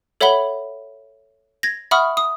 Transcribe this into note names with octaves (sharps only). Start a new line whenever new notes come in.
A4 C#5 E5 F#5 B5 G7
G#6 A#6
E5 F#5 B5 C#6 D#6 F6
D#6